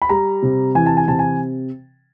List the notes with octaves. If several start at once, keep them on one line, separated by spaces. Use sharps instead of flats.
B5
G3 A#5
C3
E3 G#5
A5
G#5
C3 A5
G#5